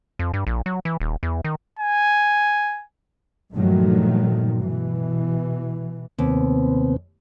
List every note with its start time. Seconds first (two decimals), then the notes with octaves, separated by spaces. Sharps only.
0.19 F2
0.34 G2
0.47 A#1
0.66 F#3
0.85 E3
1.00 D#1
1.23 E2
1.44 D#3
1.79 G#5
3.52 G2 A#2 D#3 F3 F#3 A3
4.59 B2 E3
6.19 D#2 C3 B3 C4